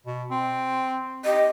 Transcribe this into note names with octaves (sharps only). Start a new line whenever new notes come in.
B2
C4
G4 D#5